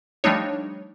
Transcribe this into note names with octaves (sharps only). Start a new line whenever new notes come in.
F3 G3 A3 D4 D#4 C#5